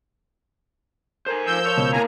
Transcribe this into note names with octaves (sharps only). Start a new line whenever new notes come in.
A4 A#4 C5 G#5 A#5
F3 E6 G6
A#4 C#5 F5 A5
C#2 B2
A2 A#3 F5 G#5 A#5